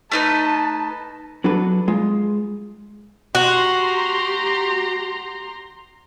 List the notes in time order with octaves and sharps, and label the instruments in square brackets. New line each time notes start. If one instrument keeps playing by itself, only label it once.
[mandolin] A3 D#4 B4 [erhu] A5
[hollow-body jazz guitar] F#3 D4 F#4 A4 B4
G#3 F4
[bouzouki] F#4 [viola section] G4 A#5 C6